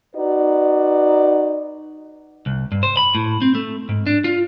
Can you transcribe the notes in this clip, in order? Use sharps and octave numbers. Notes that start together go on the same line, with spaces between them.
D#4 F#4 B4 D5
C2
G2
C5
B5
A2
C4
A3
G#2
D4
F4